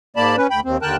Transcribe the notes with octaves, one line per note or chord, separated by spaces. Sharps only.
G#2 A#3 D5 A5 B5
C#4 B4
D2 G5 B5
D#2 C4
D#2 D3 A#4 G5 A5 F#6